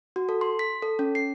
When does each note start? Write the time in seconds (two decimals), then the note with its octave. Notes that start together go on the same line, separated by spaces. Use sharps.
0.16 F#4
0.29 A4
0.41 C6
0.59 B6
0.82 A4
0.99 C#4
1.15 C7